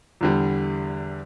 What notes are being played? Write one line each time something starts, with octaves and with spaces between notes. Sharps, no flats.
E2 D3 G3